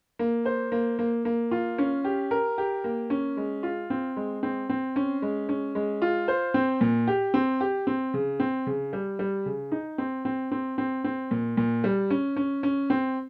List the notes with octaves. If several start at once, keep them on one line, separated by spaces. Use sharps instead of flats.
A#3
C5
A#3
A#3
A#3
F4
C#4
G4
A#4
G4
A#3
C#4
G#3
F4
C4
G#3
C4
C4
C#4
G#3
C#4
G#3
F4
C5
C4
A#2
G4
C4
G4
C4
C#3
C4
C#3
G3
G3
C#3
D#4
C4
C4
C4
C4
C4
A#2
A#2
G3
C#4
C#4
C#4
C4